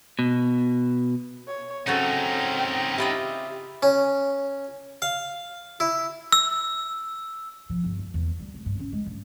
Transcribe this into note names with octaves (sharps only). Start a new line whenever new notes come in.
B2
C#5
C#3 F#3 C4 C#4 D#4 A4 G5
E4 F4 G4 D#5 E5
C#4
F5
E4
E6
F3
G1
F2
E2
G3
G3
F1
G2
C#4
G#3
G2